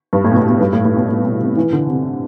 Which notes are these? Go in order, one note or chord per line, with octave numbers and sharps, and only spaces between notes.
G2
A2
B2
A2
B2
G2
A2
A2
B2
A2
B2
C3
E3
D3
C3